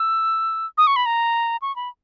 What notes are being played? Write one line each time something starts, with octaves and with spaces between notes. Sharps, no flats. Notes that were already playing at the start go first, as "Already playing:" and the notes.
Already playing: E6
D#6
C#6
B5
A#5
C#6
B5